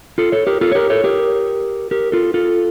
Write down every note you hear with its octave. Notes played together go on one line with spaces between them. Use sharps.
F4 A4
A4 C#5
G4 A#4
F4 A4
C#5
G4 A#4
A4 C#5
G4 A#4
G4 A#4
F4 A4
F4 A4